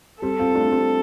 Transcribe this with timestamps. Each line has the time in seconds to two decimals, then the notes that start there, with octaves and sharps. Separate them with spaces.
0.22 G3 C4 A4
0.39 C4 F4
0.55 A3 D4
0.72 G3 C4